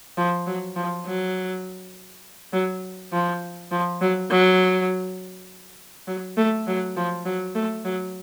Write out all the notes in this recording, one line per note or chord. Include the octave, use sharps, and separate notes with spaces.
F3
F#3
F3
F#3
F#3
F3
F3
F#3
F#3
F#3
A3
F#3
F3
F#3
A3
F#3